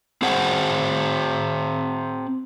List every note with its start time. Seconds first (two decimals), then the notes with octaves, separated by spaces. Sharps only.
0.22 C4 G#4 C5 F#5